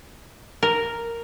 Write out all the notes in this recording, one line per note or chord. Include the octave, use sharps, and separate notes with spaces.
A#4